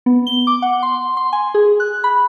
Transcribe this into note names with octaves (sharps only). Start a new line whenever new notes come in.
B3
G7
D6
F#5
C6
C6
G#5
G#4
F#6
B5